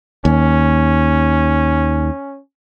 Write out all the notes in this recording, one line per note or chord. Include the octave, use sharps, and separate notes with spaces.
D#2 C#4